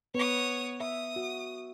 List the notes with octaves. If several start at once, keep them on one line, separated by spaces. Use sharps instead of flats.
B3 B4 C#5 D#6
E5 D#6
F#4